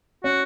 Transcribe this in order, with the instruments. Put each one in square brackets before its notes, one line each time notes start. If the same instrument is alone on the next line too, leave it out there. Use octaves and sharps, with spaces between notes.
[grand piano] C#4 [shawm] F#4